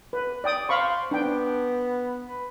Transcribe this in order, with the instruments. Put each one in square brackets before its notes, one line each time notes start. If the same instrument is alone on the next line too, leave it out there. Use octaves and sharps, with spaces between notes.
[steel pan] B4
D5 G5 D#6
[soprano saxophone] C5 [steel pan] F5 B5 C#6
[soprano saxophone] B3 [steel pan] D4 G5
[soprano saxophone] B4